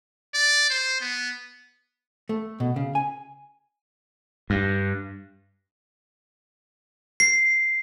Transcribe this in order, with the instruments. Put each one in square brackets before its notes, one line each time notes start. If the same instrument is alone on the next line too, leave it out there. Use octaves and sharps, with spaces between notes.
[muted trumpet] D5
C5
B3
[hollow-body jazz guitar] A3
B2
C#3
G#5
[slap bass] G2
[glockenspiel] C7